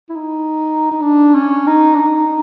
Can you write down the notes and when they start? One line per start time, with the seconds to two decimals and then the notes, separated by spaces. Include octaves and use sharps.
0.09 E4
0.15 D#4
0.91 D#4
1.01 D4
1.35 C#4
1.67 D#4
1.94 D4
1.99 D#4